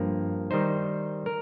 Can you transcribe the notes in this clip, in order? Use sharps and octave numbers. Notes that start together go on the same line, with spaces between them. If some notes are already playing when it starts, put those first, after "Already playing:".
Already playing: G2 F3 A#3
D#3 G3 D#4 C5
A#4